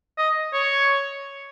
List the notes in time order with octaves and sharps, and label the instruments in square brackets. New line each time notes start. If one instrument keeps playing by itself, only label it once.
[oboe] D#5
C#5